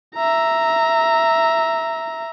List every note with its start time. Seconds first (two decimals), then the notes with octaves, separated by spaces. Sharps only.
0.16 E5 A#5